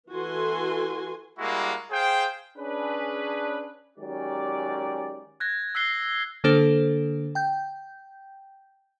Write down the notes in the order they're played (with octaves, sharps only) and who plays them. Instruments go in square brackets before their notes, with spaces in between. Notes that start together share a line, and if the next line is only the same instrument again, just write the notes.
[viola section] E3 F#4 A4 G#5 C6
[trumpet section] G3 G#3 A#3 E4 F#4
G#4 C5 F5 G5
[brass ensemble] C#4 D4 G#4 B4
D#3 F#3 G#3 C#4 G4 D5
[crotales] F#6 G#6 A#6
E6 F#6 B6 C7 G7
[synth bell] D3 A#3 D4 A4 C5
G5 G6